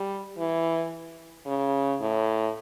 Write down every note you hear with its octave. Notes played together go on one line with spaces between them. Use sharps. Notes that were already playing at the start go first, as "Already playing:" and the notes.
Already playing: G3
E3
C#3
A2